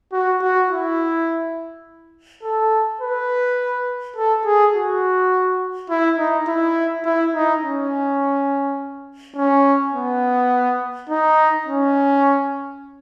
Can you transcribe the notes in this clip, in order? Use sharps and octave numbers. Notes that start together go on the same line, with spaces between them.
F#4
F#4
E4
A4
B4
A4
G#4
F#4
E4
D#4
E4
E4
D#4
C#4
C#4
B3
D#4
C#4